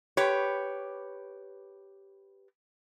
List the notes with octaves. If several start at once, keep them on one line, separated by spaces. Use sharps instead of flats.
G4 B4 C#5